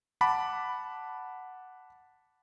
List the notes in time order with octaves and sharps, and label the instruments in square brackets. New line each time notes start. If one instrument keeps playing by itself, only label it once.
[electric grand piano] F#5 A5 B5 D6